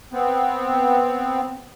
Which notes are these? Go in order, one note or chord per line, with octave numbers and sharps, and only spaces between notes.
B3 C4